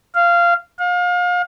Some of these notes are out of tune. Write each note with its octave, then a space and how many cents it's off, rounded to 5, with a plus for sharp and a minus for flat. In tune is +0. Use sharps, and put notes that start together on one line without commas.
F5 -15
F5 +35